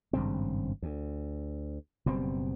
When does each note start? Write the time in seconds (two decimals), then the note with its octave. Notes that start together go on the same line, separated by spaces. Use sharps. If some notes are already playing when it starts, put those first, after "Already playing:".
0.13 G#1 G2 C#3 C4
0.82 D2
2.06 F#1 B2 G3 C4